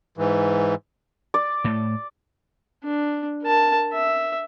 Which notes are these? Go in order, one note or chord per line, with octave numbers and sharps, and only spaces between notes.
G#2 E3
D5
A2 A3
D4
A#4 A5
E5